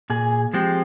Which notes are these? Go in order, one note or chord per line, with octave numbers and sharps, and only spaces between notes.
A#2 G#4
F3 G#3 C4 G4